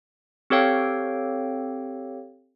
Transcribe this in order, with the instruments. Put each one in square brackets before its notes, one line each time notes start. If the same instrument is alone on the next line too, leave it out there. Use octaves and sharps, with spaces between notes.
[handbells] C4 G4 A4 C#5 F5 G5